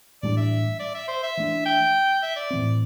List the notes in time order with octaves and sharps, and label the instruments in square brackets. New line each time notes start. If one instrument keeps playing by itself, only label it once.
[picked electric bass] A2 E3 G3 D4 [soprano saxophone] D5
[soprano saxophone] E5
D5
E5
C5
E5
[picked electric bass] E3 A3 D4
[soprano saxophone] G5
E5
D5
[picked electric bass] A2 E3 C4